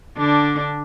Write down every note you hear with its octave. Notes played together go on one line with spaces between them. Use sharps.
D3 D4